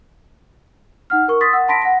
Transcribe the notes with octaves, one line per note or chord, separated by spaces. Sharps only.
D#4 F#5 F6
A#4 C#6
C6 D#6 A6 B6
F#5 E6
A5 B5 C6 A#6 B6 D7
F#5 A#6